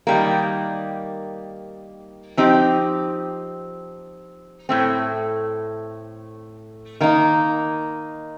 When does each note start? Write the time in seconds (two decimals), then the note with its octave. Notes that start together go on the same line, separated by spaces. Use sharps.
0.07 D#3 G3 A#3
2.37 F3 C4 D#4 G4
4.69 A2 A3 C4
7.00 D#3 A#3 D#4